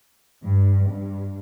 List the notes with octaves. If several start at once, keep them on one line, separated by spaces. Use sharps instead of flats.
G2
G2